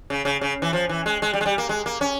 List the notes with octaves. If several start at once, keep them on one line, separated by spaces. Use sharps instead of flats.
C#3
C#3
C#3
E3
F3
E3
G#3
G#3
G3
G#3
G3
A#3
G#3
A#3
C#4